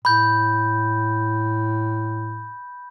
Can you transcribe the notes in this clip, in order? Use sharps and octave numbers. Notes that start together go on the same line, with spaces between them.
A2 B5 G6